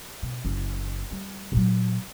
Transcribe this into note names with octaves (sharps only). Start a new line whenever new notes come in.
B2
F#1
G3
A#2 F#3